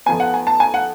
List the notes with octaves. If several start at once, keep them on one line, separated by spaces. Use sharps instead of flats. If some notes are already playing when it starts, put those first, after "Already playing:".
F2 F3 B3 G#5
F#5
G#5
A5
G#5
F#5